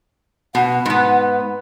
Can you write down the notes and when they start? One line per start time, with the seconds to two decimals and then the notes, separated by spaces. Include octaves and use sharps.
0.55 B2 F#5
0.86 G#2 B3